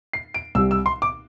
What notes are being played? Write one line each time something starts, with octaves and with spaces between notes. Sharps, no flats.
C7
D7
C2 C3 G3 E6
E6
C6
D6